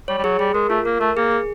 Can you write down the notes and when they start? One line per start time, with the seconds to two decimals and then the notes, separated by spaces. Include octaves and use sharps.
0.08 G3 C#5
0.18 G3
0.24 F#3 G#4
0.39 G3 G#4
0.54 G#3 A#4
0.69 A3 F4
0.85 A#3 A#4
1.00 A3 A#4
1.17 A#3 G#4
1.31 G#4